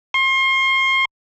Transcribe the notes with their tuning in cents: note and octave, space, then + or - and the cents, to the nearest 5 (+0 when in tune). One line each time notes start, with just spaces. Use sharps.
C6 +35